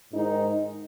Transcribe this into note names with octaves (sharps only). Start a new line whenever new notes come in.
G#2 D#3 D#4